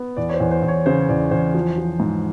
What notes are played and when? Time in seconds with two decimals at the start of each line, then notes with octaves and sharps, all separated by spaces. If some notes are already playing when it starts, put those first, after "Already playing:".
Already playing: B3
0.17 E2 D5
0.29 C#5
0.34 C5
0.40 E2
0.51 C5
0.63 E2
0.68 C#5
0.86 C#3 C5
1.09 E2 D5
1.31 E2 C5
1.54 F3
1.78 F3
2.00 G#2